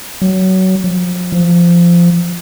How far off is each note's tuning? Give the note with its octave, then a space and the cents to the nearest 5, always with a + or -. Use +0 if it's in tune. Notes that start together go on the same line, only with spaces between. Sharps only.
F#3 +20
F3 +40
F3 -15